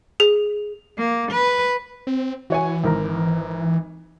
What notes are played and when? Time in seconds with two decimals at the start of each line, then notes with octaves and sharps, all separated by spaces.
0.20 G#4
0.98 A#3
1.32 B4
2.07 C4
2.50 E3 F#4 C#5 G#5
2.84 G#1 A#4 A#5